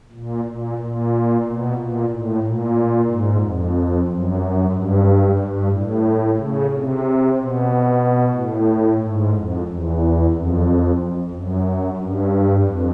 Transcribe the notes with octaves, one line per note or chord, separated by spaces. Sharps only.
A#2
A#2
A#2
B2
A#2
A2
A#2
G#2
F2
F#2
G2
G2
A2
C#3
C3
B2
A2
G#2
F2
E2
F2
F#2
G2
F2